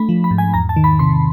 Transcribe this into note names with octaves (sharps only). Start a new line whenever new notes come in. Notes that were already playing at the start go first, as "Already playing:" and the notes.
Already playing: A3 D4 B5
F3
B5
G#2
G#5
E2 A#5
A5
D#3
B5
C3 C6